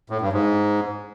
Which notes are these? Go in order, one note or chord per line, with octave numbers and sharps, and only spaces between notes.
A2
G2
G#2